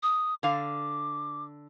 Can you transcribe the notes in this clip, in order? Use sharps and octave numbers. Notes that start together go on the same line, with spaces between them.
D#6
D3 F5 D6